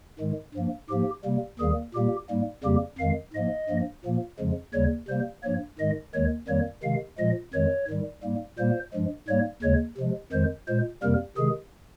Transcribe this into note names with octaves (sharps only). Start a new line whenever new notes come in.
G#2 D#3 G#3
G2 F3 A#3
G#2 F3 A#3 G4
C3 G3 A#3
D#2 D#3 G3 A#3 G#4
A#2 G3 A#3 G4
G#2 G3 A#3
F2 C#3 G3 A#3 G4
F2 D#3 G#3 F5
G#2 F3 A#3 D#5
G2 F3 A#3
A#2 F3 A#3
F2 C#3 F3 G#3
D#2 C#3 G3 C#5
C3 G3 A#3 C5
G2 F3 A#3 C#5
G#2 D#3 G#3 D#5
D#2 D#3 G#3 C#5
F2 D#3 G3 A#3 C#5
C3 D#3 G#3 F5
A#2 F3 G#3 D#5
F2 D#3 G#3 C#5
G#2 D#3 G3
G#2 G3 A#3
A#2 G3 A#3 C5
G2 F3 G#3
G#2 G3 A#3 C#5
D#2 C#3 G#3 C#5
C3 F3 G#3
F2 D#3 G#3 C5
A#2 G#3 C5
F2 C3 G3 A#3 A#4
C3 D#3 G#3 G#4